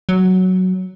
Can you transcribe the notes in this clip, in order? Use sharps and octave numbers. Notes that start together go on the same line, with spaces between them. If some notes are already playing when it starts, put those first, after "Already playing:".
F#3